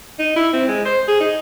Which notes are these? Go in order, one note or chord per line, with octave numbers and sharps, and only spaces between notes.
D#4
E4
C4
G#3
C5
G#4
D#4